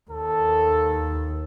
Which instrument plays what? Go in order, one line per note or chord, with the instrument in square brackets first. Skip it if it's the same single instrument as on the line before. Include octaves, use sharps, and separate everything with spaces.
[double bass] D#2 [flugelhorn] A4